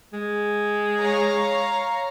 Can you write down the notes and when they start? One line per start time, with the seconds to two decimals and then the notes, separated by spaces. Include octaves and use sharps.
0.13 G#3
1.00 C#5 F5 A#5